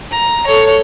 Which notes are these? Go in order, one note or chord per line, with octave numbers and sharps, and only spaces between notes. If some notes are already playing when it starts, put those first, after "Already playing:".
A#5
A4 C#5